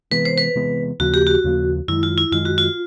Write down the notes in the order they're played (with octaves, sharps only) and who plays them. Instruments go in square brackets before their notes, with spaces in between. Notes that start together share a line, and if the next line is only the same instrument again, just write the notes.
[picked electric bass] C3 E3 G#3 B3 [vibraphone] B4
[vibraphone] C5
B4
[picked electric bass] C3 E3 G#3 B3
[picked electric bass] D#2 C#3 F3 A#3 [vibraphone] F#4
[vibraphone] G4
F#4
[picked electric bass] D#2 C#3 F3 A#3
[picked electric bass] F#2 D#3 G#3 [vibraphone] E4
[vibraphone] F4
E4
[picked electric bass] F#2 D#3 G#3 [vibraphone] F4
[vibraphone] F#4
F4